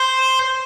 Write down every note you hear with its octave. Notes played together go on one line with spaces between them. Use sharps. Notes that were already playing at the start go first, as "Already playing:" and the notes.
Already playing: C5